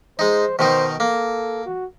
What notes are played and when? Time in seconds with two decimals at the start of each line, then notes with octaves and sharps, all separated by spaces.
0.19 G#3 D#4 C5
0.59 B2 D#3 D#4 C5
1.00 A#3 A4
1.66 F#4